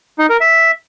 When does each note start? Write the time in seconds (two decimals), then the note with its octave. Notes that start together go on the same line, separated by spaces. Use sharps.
0.19 D#4
0.30 A#4
0.41 E5